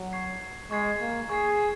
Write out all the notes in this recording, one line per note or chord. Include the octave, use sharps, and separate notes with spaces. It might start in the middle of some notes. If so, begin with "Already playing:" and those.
Already playing: F#3
C#6 G#6 C7
G#3 C#6 G#6 C7
A#3
G#4 C#6 G#6 C7